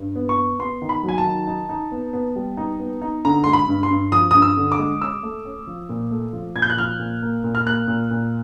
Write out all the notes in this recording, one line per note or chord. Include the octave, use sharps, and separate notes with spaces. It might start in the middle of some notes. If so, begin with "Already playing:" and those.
Already playing: G2
B3
C#6
B3
B3 C6
D#3
B5
F#3
G#5
A5
D#3
D#4
D#4
B3
B3
G3
D#4
B3
D#4
D3 A#5
G#3 C6
B5
G2
C6
G2
F3 D#6
G2 D#6
E6
D3
D6
G#3
C#4 E6
A3
C#4
F3
A#2
A3
F3
A#2 G#6
G6
F#6
F3 F6
A#2
A#3
A#2
F6
A#3 F#6
A#2
A#2